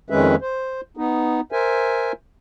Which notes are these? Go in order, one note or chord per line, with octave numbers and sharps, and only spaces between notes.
F2 D#3 G#3 C#4 B4 E5
C5
B3 D#4
A#4 C5 E5 G#5